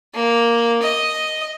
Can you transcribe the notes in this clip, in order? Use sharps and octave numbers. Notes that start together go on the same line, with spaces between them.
A#3
D#5